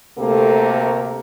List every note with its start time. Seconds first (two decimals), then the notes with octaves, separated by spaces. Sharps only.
0.18 D2 C3 A3 A#3 A4 A#4